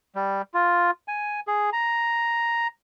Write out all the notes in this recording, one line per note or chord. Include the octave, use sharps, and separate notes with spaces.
G3
F4
G#5
G#4
A#5